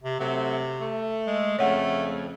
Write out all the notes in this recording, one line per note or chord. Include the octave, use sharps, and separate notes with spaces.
C3
C3 F#3 A3 C4
A3
G#3
F2 C#3 A3 C#5 F#5